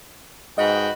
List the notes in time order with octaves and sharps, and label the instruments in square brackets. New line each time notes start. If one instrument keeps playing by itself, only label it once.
[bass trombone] G#2 [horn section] F#4 B4 G5 [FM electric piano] D#5